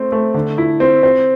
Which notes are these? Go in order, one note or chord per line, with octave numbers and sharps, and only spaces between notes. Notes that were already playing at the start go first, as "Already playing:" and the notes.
Already playing: A3 C4
A3
D3
E4
C4
C4